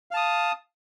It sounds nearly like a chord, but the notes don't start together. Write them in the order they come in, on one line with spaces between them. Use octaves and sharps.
F5 A5 D#6